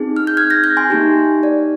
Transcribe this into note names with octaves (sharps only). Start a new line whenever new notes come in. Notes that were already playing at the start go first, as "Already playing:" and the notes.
Already playing: C4 D#4 G#4
F6
G6
F6 G#6
G6 A#6
G6 A#6
G#5 C6
A#3 D#4 G4
D5